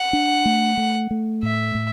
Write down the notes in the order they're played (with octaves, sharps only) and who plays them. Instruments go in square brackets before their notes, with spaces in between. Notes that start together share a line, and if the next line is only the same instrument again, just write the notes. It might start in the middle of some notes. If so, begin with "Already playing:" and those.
Already playing: [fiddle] F#5
[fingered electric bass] D4
A3
A3
A3
[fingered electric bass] A2 [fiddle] E5
[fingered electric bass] A2